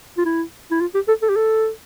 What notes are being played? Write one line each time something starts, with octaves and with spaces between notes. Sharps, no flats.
F4
E4
E4
F4
G4
A4
A4
G4
A4